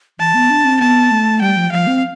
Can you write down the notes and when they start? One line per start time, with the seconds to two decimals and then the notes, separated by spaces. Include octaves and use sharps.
0.19 E3 A5
0.34 B3
0.50 D4
0.65 C4
0.80 B3 A5
1.11 A3
1.41 G3 G5
1.57 F3
1.72 F3 F5
1.87 C4